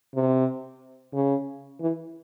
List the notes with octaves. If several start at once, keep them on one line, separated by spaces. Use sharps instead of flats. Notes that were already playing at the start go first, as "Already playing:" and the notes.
C3
C#3
E3